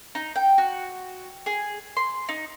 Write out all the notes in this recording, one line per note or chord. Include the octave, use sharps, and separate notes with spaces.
D#4
G5
F#4
G#4
C6
D#4